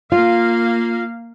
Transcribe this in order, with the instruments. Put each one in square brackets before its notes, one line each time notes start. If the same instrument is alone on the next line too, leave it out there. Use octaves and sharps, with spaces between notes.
[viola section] A#3 F5 [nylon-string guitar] F4